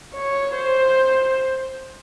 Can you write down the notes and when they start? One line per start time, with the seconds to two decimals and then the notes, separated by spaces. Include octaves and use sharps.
0.15 C#5
0.56 C5